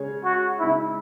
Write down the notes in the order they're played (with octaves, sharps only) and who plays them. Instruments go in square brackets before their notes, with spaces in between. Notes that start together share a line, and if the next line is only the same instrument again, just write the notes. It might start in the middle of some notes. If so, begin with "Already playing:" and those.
Already playing: [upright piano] C#3 G#3 C#4 G#4 C#5
[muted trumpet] F#4
[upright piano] C#3 G#3 D#4 [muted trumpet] E4